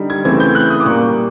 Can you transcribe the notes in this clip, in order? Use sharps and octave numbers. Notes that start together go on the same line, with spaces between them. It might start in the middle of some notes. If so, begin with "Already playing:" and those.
Already playing: D3 G3 D#4
G#6
C#3 E3 A3 C4 G#6
G6
F#6
D#6
D6
A#2 G3 A#3 C#6